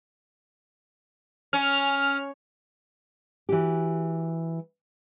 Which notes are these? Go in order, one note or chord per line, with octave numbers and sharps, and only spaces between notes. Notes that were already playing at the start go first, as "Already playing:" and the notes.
C#4 F6
E3 F#4 G4